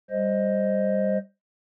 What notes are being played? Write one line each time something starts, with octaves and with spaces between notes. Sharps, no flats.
G3 C5 D#5